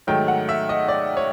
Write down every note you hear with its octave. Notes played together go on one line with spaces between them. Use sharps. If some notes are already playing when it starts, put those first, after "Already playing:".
G#2 D#3 F#3 A3 G5
F#5
E5
D#5
D5
C#5